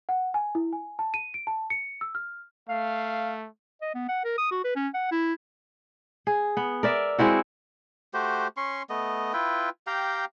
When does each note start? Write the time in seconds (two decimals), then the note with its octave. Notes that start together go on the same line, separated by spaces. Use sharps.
0.09 F#5
0.34 G#5
0.55 E4
0.73 G#5
0.99 A5
1.14 D#7
1.34 D7
1.47 A5
1.70 C#7
2.01 E6
2.15 F6
2.69 A3 F5
3.82 D#5
3.94 B3
4.08 F#5
4.24 A#4
4.38 D#6
4.51 F#4
4.64 B4
4.76 C#4
4.94 F#5
5.11 E4
6.27 G#4
6.57 B3
6.83 A#4 D5 E5
7.18 G#3 C4 E4 F#4
8.14 A3 F#4 G4 C5
8.57 C#4 C6 C#6
8.90 A3 B3 D#5
9.33 E4 F4 B4 G5
9.87 G4 F5 G5 A#5